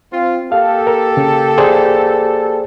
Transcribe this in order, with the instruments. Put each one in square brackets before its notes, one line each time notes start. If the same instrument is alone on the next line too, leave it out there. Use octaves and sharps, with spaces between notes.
[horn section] C4 F4
[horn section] A#3 G4 A4 [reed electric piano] F5
[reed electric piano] A#4
C#3
G#4 C5 D5